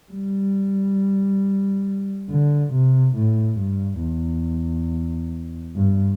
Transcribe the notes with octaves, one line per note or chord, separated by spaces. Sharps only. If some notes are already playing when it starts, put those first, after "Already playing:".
G3
D3
C3
A2
G2
E2
G2